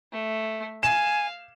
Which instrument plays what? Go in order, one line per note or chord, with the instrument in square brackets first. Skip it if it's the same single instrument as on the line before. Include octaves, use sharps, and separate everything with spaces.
[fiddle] A3
[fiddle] F5 [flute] G#5 [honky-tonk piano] E7